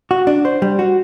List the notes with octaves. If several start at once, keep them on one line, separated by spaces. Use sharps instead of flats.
F#4
D4
C5
G3
F#4